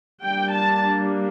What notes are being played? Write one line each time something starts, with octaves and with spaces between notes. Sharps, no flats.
G3 A#3 D4 G5
A5